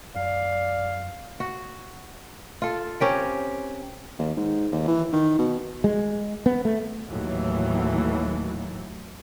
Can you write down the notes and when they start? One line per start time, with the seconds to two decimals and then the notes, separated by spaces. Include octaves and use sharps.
0.16 F#2 D5 F5
1.40 F#4
2.62 F4 A4
3.00 C4 C#4 G4 A#4
4.19 D#2
4.36 G#2
4.72 D#2
4.88 E3
5.13 D#3
5.39 B2
5.84 G#3
6.46 B3
6.65 A3
7.07 D#2 A2 E3 F#3